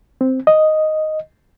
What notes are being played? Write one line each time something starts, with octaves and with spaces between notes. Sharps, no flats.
C4
D#5